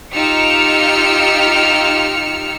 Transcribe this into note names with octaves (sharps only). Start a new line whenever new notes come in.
D#4 F4 G4 E6 F6 C#7